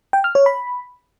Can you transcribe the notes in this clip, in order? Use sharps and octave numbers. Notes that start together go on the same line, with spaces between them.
G5
F6
C#5
B5